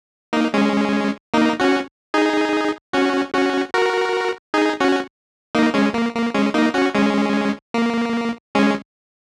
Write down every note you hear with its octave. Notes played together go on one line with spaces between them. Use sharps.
A#3 D#4
G#3 C#4
A#3 D#4
C#4 F#4
D#4 G#4
C#4 F#4
C#4 F#4
F#4 A#4
D#4 G#4
C#4 F#4
A#3 D#4
G#3 C#4
A#3
A#3
G#3 C#4
A#3 D#4
C#4 F#4
G#3 C#4
A#3
G#3 C#4